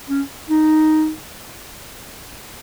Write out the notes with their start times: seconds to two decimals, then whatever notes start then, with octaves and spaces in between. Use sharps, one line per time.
0.09 C#4
0.49 D#4